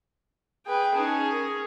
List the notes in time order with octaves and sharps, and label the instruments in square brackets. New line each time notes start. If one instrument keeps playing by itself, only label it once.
[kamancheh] G#4 B4 [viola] G5
[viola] C#4 G#4 [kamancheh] D#4 A5
[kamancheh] A#4